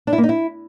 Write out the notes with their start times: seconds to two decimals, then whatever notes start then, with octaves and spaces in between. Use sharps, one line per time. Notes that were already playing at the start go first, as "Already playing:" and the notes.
0.07 D4
0.13 E4
0.18 A#3
0.23 D#4
0.29 E4